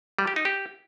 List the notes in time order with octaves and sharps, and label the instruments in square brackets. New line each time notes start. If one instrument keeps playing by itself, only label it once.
[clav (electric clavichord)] G3
G4
D#4
G4